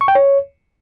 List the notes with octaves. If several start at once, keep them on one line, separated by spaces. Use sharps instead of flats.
C#6
G5
C#5